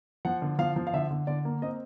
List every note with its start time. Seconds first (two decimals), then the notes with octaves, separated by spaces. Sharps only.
0.25 F3 F#5
0.42 D3
0.58 F3 F5
0.76 F3
0.87 F5
0.93 D3 E5
1.11 D3
1.27 D3 D5
1.45 A#3
1.62 C4 D#5